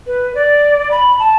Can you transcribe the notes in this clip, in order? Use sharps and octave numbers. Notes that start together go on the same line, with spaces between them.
B4
D5
B5
A5